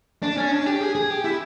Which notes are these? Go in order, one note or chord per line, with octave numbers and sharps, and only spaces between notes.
D4
C#4
D4
G4
G#4
G#4
G4
E4